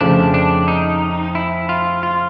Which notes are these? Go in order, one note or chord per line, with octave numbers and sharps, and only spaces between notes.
F2 C#3 F3 A3 D4
D4
D#4
E4
F4
F4